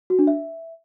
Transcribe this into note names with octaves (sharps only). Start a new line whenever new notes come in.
F#4
D4
E5